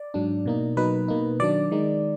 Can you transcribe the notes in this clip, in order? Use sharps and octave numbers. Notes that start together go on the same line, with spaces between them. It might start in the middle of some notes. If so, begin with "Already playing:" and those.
Already playing: D5
G#2 F#3 D4
B2 A#3 D#4
B2 F#3 A#3 D#4 B4
B2 A#3 D#4
D#3 F#3 D4 D5
D#3 G#3 D#4